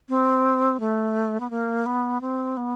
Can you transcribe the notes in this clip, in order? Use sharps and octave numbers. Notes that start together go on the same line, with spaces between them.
C4
A3
B3
A#3
B3
C4
B3